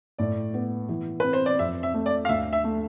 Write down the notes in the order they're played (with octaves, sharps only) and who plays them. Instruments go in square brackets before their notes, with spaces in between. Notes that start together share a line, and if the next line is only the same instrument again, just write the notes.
[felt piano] A2 [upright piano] D5
[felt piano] B3
E3
[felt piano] C4 [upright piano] B4
[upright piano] C5
D5
[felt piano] F2 [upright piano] E5
[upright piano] E5
[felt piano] A3
[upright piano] D5
F5
[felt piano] D2 [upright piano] E5
[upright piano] E5
[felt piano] A3